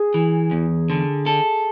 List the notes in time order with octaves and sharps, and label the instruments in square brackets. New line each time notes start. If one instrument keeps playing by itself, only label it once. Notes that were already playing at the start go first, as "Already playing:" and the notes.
Already playing: [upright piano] G#4
[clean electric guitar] E3
E2
D3
A4